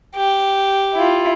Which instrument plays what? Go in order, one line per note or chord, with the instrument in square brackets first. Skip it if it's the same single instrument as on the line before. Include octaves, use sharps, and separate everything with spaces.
[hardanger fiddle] G4
[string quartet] E4 F4